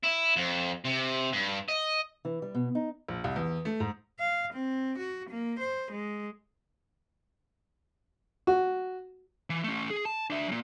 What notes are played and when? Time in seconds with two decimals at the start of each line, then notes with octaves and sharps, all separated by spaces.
0.04 E4
0.36 F2
0.85 C3
1.33 G2
1.68 D#5
2.25 E3
2.42 G3
2.55 B2
2.75 D#4
3.09 A#1
3.24 C2
3.36 E2
3.65 A3
3.80 G#2
4.20 F5
4.54 C4
4.98 F#4
5.30 A#3
5.60 C5
5.92 G#3
8.47 F#4
9.50 E3
9.64 A3 C#4
9.90 G#4
10.05 A5
10.30 D4 E5
10.48 A#2 F#3